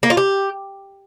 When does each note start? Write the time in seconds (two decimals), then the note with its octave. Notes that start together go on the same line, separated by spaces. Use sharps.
0.03 A#3
0.10 F4
0.17 G4